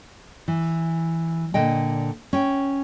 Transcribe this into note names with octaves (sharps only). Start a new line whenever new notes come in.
E3
A#2 D3 D#5 G5
C#4 G5